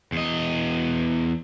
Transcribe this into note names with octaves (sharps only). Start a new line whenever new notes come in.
E2 D#5